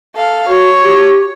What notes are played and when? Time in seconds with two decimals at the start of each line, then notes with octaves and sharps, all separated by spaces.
0.16 A4 F5
0.48 F#4 C#5
0.84 G4